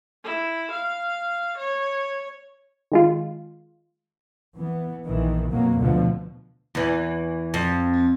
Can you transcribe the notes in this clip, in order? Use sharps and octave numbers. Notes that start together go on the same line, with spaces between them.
E4
F5
C#5
D#3 G#3 F4
E3 B3
A#1 D#3 E3
F2 B2 F#3 A#3
D2 B2 D3 F3
E2 E3
F2